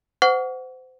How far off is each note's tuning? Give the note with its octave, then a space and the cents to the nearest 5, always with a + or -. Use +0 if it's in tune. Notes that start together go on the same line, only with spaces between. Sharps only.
C5 -25 F#5 +0 C#6 +45